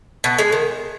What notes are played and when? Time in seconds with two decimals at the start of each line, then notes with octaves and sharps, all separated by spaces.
0.24 B2
0.38 G#3
0.52 D#3